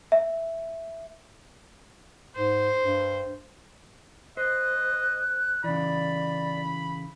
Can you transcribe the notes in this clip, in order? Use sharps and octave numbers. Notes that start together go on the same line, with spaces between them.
E5
G#2 C5
G2
C5 D#5 F#6
C#3 E3 D5 B5